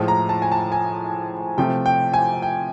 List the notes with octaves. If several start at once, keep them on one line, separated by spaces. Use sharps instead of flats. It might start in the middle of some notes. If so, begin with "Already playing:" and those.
Already playing: A2 F3 G#3
A#5
A5
G#5
A5
G#5
C3 F3 A3 G5
G5
G#5
G5